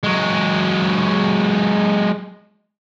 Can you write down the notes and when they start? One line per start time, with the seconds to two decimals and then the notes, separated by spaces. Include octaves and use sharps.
0.04 F#3 G#3